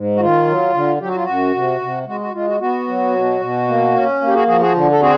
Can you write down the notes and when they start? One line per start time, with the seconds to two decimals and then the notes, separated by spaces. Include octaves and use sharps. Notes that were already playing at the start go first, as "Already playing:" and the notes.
Already playing: G#2
0.16 F#4
0.20 D#3 F4
0.47 F#3
0.74 D3
1.01 F#3 G4
1.08 F#4
1.16 F4
1.24 F#2 F#4
1.54 C3
1.81 C3
2.07 G#3 F#4
2.21 F#4
2.34 G#3 F4
2.47 F#4
2.60 B3 F#4
2.87 F#3
3.15 B2
3.41 B2
3.67 A#3
3.94 C#4
4.21 A#3
4.28 G4
4.34 F#4 G#4
4.47 F3 F#4 G#4
4.61 F#4 G#4
4.74 D3
4.91 A4
5.01 C4 F#4 G#4